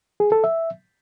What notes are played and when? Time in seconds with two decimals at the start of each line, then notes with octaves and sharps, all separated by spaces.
0.20 G#4
0.32 A4
0.44 E5